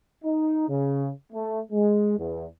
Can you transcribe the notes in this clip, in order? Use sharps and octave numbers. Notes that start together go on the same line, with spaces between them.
D#4
C#3
A3
G#3
E2